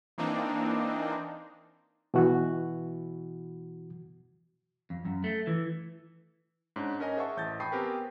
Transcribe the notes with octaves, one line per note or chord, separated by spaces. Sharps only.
E3 A#3 C4 D4 D#4
B2 E3 F#4
F2
F#2
A3
E3
G#2 C#4 D4
C#4 A#4 D#5 G#5
G#4 C5 E5 F#5 A5 C#6
A1 G6 A6
G5 A5 B5 C#6 D#6 C7
B3 C4 G4 A#4 B4 G#5